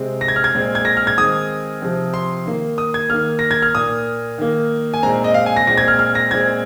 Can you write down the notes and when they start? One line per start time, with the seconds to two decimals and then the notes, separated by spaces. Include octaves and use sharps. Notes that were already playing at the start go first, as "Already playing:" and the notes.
Already playing: C3 G#3 C4
0.21 A#6
0.28 G#6
0.36 F6
0.44 G#6
0.54 A#2 G#3 C4
0.75 G#6
0.85 A#6
0.97 F6
1.07 G#6
1.18 D#3 G#3 C4 D#6
1.82 C3 F3 C4
2.14 C6
2.46 D#3 A#3
2.78 D#6
2.94 G#6
3.10 D#3 A#3 F6
3.39 A#6
3.51 G#6
3.62 F6
3.75 A#2 A#3 D#6
4.38 D#3 A#3
4.94 G#5
5.03 A#2 G#3 C4 A#5
5.24 D#5
5.34 F5
5.46 G#5
5.56 A#6
5.67 A#2 G#3 C4 A#6
5.77 G#6
5.88 F6
5.99 F6
6.15 A#6
6.31 A#2 G#3 C4 G#6